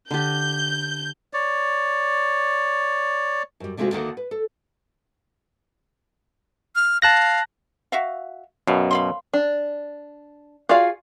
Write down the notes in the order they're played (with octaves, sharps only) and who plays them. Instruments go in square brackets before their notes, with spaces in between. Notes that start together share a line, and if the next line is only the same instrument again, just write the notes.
[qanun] D3 G4 [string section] G6
[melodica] C#5 D5
[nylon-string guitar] F#2 G3
D2 C3 G#3 A3 F4 F#4
D2 D3 D#3 A#3 D4 F#5
B4
A4
[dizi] F6
[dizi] F5 [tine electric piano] A5 F#6 A#6
[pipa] F#4 E5 F5
[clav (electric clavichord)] F#2 B2 [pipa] F5
[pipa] F5 B5 C6
[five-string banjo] D4
F4 F#4 G#4 D5 F5